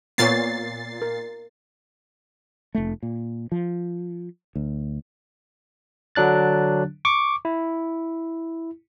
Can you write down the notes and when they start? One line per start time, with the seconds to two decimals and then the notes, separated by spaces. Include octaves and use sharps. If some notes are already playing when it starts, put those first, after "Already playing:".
0.18 A#2 B3 C#5 A6 C7
1.02 A#4
2.75 F1 A3
3.03 A#2
3.52 F3
4.55 D2
6.15 D3 F#3 D4 F#6 A6
7.05 C#6 D6
7.45 E4